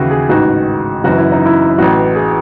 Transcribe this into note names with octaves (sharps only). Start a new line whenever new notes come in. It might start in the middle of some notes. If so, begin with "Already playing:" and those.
Already playing: D#2 C#3 E3 E4 F#4
G#4
A1 G#2 D#3 F#4
F#1 F#2 E3 F#4
E4
D#4
E4
A1 A2 E3 F#4
G#4